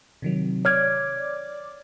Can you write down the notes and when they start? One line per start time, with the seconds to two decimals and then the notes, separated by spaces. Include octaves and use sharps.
0.22 C3 D#3 F#3
0.65 C#5 D5 D6 F6 G#6